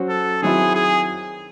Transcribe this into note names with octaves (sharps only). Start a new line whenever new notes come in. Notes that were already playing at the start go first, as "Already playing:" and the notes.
Already playing: F#3 C#4 F#4 C5
A4
D#3 F#3 C4 E4 G#4
G#4